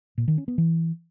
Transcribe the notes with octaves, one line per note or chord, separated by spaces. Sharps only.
A#2
D#3
C#4
B3
E3